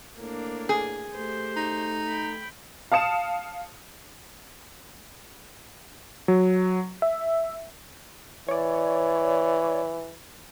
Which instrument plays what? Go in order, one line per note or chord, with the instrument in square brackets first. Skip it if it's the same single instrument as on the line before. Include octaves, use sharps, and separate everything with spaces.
[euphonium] A2 [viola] A#3 D4
[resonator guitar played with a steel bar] G#4
[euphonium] A3 [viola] G4 C5
[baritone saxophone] D#4
[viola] G5 B5
[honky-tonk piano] F5 A5 D#6 C#7 E7
[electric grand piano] F#3
E5
[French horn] E3 [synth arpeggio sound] C#5 D5